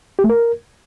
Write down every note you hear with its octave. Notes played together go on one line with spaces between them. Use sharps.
G4
A3
A#4